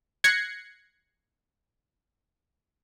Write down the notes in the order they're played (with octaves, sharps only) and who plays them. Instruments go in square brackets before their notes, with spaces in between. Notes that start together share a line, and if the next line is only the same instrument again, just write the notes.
[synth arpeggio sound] F#6 G#6 A#6 C7 C#7